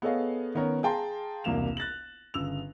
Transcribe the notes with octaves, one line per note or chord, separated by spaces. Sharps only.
B3 G#4 A4 C#5 D#5 F5
D#3 B3 C#4 A#4 C#5
G#4 F5 G5 A5 A#5 C6
E1 C2 A#3 E7 F7
F#6 A6 A#6 F#7
G1 C#3 E6 F7